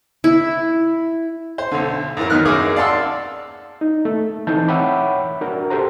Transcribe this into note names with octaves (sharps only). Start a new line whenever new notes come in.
E4
C5
B1 D3
F#2 E3 A#4
D#3 F#3 B3 D#4 F6 F#6
F#2 A#3 D#4 G#4 D6 D#6
D5 F5 F#5 A5 C6 E6
D#4
A3
E3 C4 D#4 A5 G6
C#5 E5 F#5 G5 B5 D6
D4 F#4 A#4
G4 A4 C5 A#5